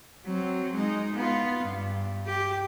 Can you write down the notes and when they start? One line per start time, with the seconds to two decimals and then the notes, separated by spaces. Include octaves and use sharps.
0.25 F#3 C4
0.73 G#3 D#4
1.15 B3 F4
1.64 G2
2.26 G4